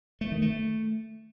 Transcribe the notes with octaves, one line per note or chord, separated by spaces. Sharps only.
A3
D#3
A3